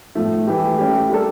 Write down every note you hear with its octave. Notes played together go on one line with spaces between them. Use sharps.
A2 F3 A3
E3 A3 E4 G4
A3 C#4 G4
G3 A#3 D4 A4